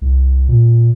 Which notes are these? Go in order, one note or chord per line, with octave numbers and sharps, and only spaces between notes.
C2
A#2